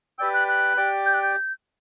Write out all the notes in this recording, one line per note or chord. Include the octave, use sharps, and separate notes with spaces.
G4 B4 D5 G5 E6
F#6
F#6
G4 D5 G5
G6
F#6
G6